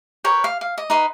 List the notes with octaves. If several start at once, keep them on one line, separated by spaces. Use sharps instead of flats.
A#4 B4 C#5 G5
F5
F5
D#5
D#4 B4 D#5 C6